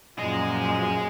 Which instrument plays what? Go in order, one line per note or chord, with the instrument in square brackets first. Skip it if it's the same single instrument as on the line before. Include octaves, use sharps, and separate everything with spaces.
[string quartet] F#2 A#2 F3 [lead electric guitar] G#4 D#5